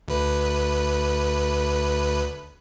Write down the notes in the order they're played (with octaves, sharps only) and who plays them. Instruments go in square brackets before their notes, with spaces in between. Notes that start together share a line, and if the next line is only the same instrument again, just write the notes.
[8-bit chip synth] D2 B4